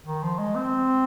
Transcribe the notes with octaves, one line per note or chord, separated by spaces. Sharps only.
D#3
F3
G#3
C4